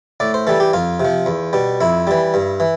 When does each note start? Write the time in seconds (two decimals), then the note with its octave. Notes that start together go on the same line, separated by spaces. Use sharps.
0.20 A2 D5
0.34 C5
0.47 E3 G3 A4
0.60 G4
0.73 F2 F4
1.00 C3
1.05 F3
1.26 E2
1.53 B2 G3
1.81 F2 E4
2.07 E3 G3
2.34 G2
2.60 E3